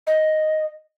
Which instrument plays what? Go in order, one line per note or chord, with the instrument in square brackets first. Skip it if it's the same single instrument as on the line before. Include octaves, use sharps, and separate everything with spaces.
[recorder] D#5